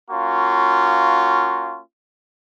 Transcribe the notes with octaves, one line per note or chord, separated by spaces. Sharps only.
A#3 C#4 F4 F#4